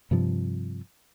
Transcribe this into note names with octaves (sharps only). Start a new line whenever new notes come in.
G2 C3 F3